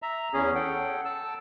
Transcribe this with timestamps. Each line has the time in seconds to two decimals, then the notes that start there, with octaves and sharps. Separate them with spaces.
0.02 E5 A#5
0.33 E2 C#4 G#4
0.55 A4 F#5 G5
1.05 A5 E6